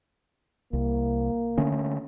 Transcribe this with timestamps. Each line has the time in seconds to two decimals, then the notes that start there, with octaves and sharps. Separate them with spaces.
0.73 C2 A#3
1.58 D3 A3 C#4